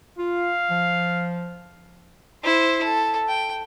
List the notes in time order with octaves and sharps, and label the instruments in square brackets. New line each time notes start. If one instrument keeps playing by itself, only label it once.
[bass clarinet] F4 [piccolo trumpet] F5
[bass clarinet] F3
[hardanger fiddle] E4 C5
A4
G5